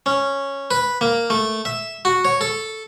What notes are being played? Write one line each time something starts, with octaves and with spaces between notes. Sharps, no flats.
C#4
B4
A#3
A3
E5
F#4
C#5
A4